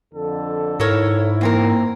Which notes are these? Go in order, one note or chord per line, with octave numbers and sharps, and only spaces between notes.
F2 D3 A4
G#2 E4 A4 A#4 C#5
E2 A#3 C4 A#4